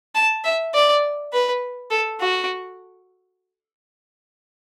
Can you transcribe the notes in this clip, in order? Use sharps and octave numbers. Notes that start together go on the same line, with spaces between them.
A5
E5
D5
B4
A4
F#4